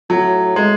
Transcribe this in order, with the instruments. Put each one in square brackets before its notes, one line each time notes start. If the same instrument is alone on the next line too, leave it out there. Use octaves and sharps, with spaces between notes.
[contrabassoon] A2 [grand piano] F#3
[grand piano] G#3